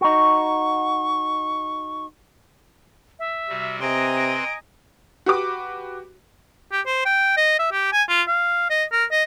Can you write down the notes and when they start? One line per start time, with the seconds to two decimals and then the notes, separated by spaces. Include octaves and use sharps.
0.01 D#4 F#4 C#6
3.19 E5
3.49 C3 G3 F#4
3.80 C3 C4 B4 D#5 G#5 A#5 C6 D7
4.16 D7
5.26 F#4 G4 B4 D6
6.72 G4
6.86 C5
7.05 G5
7.37 D#5
7.59 E5
7.72 G4
7.92 G#5
8.09 F4
8.28 F5
8.70 D#5
8.92 A#4
9.11 D#5